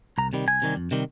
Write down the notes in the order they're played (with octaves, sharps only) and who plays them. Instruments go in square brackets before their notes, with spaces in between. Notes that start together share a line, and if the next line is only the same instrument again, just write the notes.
[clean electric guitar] C2 A#5
C3 D#3 G3
C2 G#5
C3 D#3 G3
F2
C3 D#3 G3